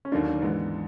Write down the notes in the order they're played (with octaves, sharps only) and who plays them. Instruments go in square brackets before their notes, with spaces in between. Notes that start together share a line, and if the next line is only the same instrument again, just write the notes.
[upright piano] C#4
[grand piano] D#2 D#3 F#3 A#3 [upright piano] D3 D4
[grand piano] G#2 E3 G#3 B3